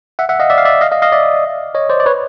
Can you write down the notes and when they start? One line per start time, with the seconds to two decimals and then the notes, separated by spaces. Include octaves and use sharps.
0.19 E5 F#5
0.29 E5 F#5
0.40 D#5 F5
0.50 D5 E5
0.58 F5
0.65 D5 E5
0.81 D#5 F5
0.92 D#5 F5
1.02 D#5 F5
1.12 D5 E5
1.75 C#5 D#5
1.90 C5 D5
2.00 D5
2.06 B4 C#5